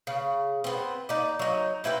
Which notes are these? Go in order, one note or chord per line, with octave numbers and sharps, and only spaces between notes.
C#3
B3 C4
D#4 D5
F#3 D#4
C4 E4 B4 G5